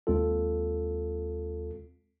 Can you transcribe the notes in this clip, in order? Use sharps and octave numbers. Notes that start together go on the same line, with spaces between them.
D#2 G#3 C4 F4 A4